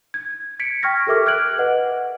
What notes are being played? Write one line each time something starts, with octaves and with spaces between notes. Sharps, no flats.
G#6
G#6 B6 C#7 D7
G5 C#6 F6 G#6 A#6
G4 A4 A#4 E5 D6 F6
F6 F#6 G#6 D7 F#7
B4 D#5 F#5